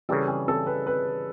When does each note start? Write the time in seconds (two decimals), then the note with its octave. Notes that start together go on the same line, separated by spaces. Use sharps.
0.09 C#3 E3 G3 A4
0.28 G#4
0.48 A4
0.67 B4
0.87 B4